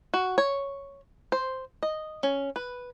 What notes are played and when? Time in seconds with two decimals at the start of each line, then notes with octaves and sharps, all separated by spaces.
0.14 F#4
0.38 C#5
1.32 C5
1.83 D#5
2.23 C#4
2.56 B4